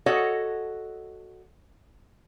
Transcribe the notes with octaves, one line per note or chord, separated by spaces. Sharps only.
F#4 A4 C#5 D#5 F#5